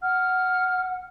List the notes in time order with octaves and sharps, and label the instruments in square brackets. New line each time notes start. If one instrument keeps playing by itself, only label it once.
[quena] F#5 [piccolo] F6